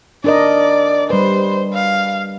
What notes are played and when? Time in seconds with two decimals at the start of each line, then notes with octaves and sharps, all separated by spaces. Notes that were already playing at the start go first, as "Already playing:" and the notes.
0.24 D4 A#4 D5 D#5
1.10 G3 B4 C5
1.74 F5